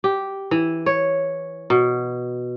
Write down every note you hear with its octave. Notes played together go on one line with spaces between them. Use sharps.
G4
E3
C#5
B2